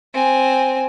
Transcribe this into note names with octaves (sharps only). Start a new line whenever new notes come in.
C4 G#5